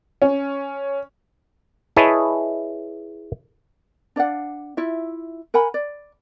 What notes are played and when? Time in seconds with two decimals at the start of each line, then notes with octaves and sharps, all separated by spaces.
0.22 C#4
1.97 E4 G#4 B4 C#5 D#5 A5
4.16 D4 D5 F5 F#5
4.77 E4 F4 E5
5.54 A#4 F#5 G#5 B5
5.74 D5